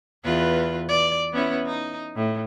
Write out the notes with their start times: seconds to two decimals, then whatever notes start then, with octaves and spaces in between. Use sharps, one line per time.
0.24 E2 F4 B4
0.88 D5
1.32 B3 C#4 E4
1.66 D#4
2.16 A2